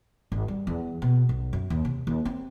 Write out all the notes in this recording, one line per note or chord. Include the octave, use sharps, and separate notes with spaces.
G#1
G3
E2
B2
B1
F#2
D#2
C3
D#2
C4